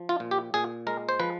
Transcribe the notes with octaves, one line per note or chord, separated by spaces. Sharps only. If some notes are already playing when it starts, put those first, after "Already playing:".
Already playing: F3
F4
A#2
G4
A#2 G#4
G#3 A#4
C5
F3 B4